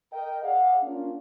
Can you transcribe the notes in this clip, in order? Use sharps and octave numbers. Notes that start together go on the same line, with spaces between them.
A#4 D#5 G5
G#4 D5 F5 F#5
A#3 C#4 D4 F4